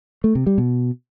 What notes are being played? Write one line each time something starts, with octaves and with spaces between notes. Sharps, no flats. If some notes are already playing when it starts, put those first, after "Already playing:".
A3
C3
G3
B2